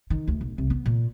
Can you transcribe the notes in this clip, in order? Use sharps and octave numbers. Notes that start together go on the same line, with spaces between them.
D#3
D2
B1
C2
B3
A#2